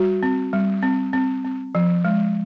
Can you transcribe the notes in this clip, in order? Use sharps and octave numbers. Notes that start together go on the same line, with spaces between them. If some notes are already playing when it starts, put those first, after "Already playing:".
Already playing: G3 F#4
C4
G3
C4
C4
C4
F3
G#3